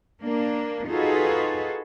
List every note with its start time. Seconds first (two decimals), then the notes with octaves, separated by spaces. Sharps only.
0.23 A#3 D4
0.88 D#4 F4 F#4 G#4 A4 B4